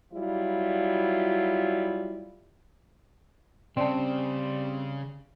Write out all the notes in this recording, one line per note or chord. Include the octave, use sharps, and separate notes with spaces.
F#3 G3 E4 F4
C#3 G3 C4 D5 A5